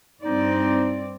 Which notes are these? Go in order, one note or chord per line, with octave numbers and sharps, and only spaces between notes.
G2 C4 D#4 D5